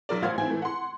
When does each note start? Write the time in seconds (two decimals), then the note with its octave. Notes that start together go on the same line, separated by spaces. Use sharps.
0.09 B1 A#4 D5
0.22 A1 C5 F5 F#5 G#6
0.38 E3 C4 E4 G#5
0.50 A2 E3 A3
0.62 F#5 C6